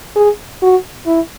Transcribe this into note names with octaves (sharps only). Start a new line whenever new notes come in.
G#4
F#4
E4